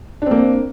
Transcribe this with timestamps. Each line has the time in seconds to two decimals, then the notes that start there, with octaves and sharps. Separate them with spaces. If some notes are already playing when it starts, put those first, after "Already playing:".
0.22 D4
0.26 C4
0.31 A#3